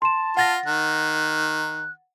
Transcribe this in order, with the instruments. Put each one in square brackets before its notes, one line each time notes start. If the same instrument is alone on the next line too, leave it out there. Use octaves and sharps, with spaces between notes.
[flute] A5 [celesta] C6 E7
[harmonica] F4 [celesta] F#5 A6 A#6
[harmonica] D#3 [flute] F#6